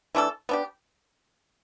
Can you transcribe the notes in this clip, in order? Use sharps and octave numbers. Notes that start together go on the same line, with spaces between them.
E3 A3 D4 A4
B3 D4 G4